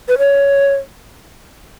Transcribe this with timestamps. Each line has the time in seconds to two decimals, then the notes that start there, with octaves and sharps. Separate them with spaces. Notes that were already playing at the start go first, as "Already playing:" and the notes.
0.08 B4
0.18 C#5